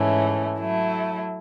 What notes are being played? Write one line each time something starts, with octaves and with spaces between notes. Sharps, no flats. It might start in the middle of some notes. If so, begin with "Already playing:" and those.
Already playing: G#2 E3 A3 C#4
F#3 A3 E4